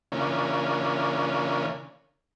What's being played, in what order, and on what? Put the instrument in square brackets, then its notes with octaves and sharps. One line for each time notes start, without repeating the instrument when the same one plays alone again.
[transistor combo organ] C#3 E3 A#3 C#4 D4 F4